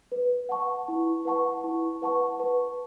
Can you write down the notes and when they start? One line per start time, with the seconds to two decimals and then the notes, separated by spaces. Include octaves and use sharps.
0.12 B4
0.49 F#5 A5 C#6
0.88 E4
1.25 B4 F#5 A5 C#6
1.64 E4
2.02 B4 F#5 A5 C#6
2.40 B4